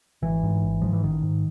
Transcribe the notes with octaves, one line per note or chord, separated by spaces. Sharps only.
G#1 E3
G#2
G#1
G#2 F3
E3
A1 D#3
G#2